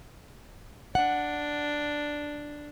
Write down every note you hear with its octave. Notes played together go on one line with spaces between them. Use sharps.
D4 F#5